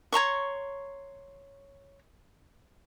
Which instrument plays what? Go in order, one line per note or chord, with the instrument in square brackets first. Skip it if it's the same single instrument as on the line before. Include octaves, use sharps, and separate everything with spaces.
[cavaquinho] C#5 A#5 C6 C#6